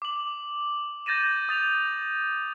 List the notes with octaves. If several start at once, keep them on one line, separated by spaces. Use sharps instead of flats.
D6 F#7
G6 A6 A#6 D#7 E7
D#6 A6 F7